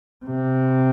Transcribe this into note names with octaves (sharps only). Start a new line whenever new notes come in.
C3